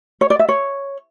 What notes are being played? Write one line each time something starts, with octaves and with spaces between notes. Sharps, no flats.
C#5
D5
E5
C#5